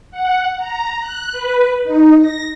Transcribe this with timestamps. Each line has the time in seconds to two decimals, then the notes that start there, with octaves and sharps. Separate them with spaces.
0.11 F#5
0.58 A#5
1.00 F#6
1.32 B4
1.84 D#4
2.21 A#6